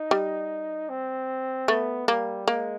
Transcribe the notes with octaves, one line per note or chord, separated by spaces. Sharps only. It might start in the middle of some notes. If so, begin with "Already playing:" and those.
Already playing: D#4
G3
C4
A3 B3
G3 A#3
G#3 A#3